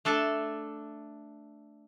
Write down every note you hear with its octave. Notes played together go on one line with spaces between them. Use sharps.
A3 D4 A4